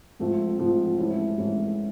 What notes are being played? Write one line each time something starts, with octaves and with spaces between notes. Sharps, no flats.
G#2 F3 A3 C4 F4
G#2 F3 A3 C4 F4
G#2 E3 A3 C#4 E4
G#2 E3 A3 C#4 E4